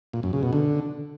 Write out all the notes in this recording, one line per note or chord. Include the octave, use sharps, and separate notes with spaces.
A#2
F#2
C#3
B2
D3